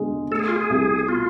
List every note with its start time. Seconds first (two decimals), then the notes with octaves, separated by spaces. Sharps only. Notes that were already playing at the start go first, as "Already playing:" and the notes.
Already playing: E2 D3 G#3
0.31 A3 A4
0.39 G#4
0.48 F4
0.56 G#4
0.70 C2
1.08 B2 F4